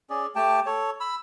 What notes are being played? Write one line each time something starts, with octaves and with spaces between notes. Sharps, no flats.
C#4 G#4 D5
A3 G4 G5 A5
A4 C#5
B5 E6